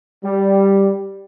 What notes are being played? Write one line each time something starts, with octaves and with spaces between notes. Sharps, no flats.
G3